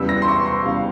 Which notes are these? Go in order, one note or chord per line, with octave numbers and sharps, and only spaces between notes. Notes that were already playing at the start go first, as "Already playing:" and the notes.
Already playing: E2 C#3 G3 E6
A#6
C6
C#6
C6
E2 C#3 G3 F5